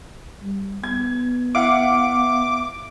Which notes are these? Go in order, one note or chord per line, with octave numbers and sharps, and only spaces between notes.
G3
B3 G#6
E4 F5 F#5 D6